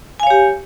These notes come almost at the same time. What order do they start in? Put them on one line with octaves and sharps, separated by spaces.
G#5 F5 C#5 G4